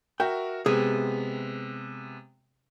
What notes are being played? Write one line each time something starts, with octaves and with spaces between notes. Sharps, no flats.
F#4 A#4 E5 G5
C3 G#3 B3 G#4